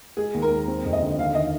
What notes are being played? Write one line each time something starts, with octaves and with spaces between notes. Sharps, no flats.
G#3 G#4
D#2
A#4
G#3
C4
F2
D#5
D3
D#2 F5
D#3 D#5